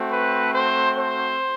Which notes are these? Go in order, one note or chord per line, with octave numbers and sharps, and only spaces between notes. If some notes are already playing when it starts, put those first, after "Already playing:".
Already playing: A3 C4 F#4
B4
C5
C5